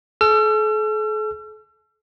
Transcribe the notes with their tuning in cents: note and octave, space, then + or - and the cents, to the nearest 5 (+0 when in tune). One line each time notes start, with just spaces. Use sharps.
A4 -45 E6 +45